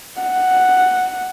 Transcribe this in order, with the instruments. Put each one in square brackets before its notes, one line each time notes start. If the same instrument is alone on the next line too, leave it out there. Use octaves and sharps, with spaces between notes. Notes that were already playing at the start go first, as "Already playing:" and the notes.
[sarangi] F#5